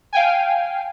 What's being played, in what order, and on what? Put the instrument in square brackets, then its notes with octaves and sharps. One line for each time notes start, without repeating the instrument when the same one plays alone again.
[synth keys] F5 G5 G#5